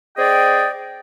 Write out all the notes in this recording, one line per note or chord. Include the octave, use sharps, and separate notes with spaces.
C4 G#4 D5 D#5 G5